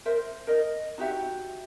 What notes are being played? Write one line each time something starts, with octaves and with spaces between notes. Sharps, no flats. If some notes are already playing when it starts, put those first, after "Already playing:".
A#4 C5 E5
A#4 D#5
D#4 F#4 G4 E5